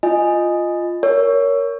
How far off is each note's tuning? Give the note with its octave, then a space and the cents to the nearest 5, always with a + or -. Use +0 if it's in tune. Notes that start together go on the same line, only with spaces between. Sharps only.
F4 +0 D#5 -5 G#5 +0
A#4 +0 C#5 +15